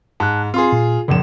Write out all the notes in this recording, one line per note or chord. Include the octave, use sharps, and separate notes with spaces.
G#2 A5 F#6
C4 F4 G#4 C6
A#2
F1 A#1 C#3 F3 E7